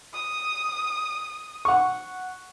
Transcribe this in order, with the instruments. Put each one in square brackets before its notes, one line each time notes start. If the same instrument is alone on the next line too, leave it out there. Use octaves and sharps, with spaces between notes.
[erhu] D#6
[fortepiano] F#5 C#6